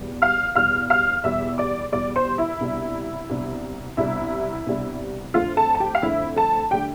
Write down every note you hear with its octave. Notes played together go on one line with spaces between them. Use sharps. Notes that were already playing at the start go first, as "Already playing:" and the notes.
Already playing: E2 B2 G3
F5 F6
E2 B2 G3 F5 F6
F5 F6
E2 B2 G3 E5 E6
D5 D6
E2 B2 G3 D5 D6
C5 C6
E4 E5
C2 B2 G3 D4
C2 B2 G3 D4
C2 B2 G3 D4 E4 E5
C2 B2 G3 D4
F2 D3 A3 F4 F5
A4 A5
A5
G4 G5
F5
F2 D3 A3 E4 E5
A4 A5
D3 A3 G4 G5